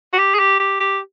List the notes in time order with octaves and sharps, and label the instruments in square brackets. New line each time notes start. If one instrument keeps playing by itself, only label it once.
[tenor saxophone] F#4
G4
G#4
G4
G4
G4